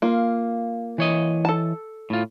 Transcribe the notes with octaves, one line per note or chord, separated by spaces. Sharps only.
A#3 F4
E3 C#5 D#5
A4 A5
A2 F4